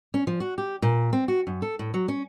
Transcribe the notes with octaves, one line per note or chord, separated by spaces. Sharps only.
C#4
F3
F#4
G4
A#2
C4
F#4
F#2
A4
A2
F#3
C#4